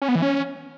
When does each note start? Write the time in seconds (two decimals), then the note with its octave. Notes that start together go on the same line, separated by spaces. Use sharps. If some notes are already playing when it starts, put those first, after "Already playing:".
0.02 C#4
0.08 B3
0.15 E3
0.22 C#4